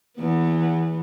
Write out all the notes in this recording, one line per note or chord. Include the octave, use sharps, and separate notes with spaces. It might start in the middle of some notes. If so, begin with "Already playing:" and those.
E2 B3